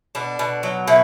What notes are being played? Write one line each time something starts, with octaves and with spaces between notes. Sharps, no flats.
B2 D4
B2
F#3
B2 E4